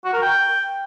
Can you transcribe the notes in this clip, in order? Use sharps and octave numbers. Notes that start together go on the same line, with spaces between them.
F#4
A#4
G5